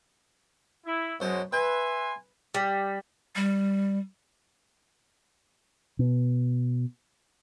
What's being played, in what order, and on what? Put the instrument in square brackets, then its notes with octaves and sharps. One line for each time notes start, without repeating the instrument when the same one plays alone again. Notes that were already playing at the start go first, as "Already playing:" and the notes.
[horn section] E4
[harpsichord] F#2 C5 [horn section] B2 F#3 G#3
[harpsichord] B4 [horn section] E5 G#5 C6
[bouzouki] G3
[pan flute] G3
[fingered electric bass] B2